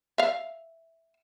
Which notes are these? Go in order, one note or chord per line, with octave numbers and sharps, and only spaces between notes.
E5 F5